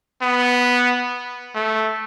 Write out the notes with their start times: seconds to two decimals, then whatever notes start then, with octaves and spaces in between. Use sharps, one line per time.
0.22 B3
1.55 A3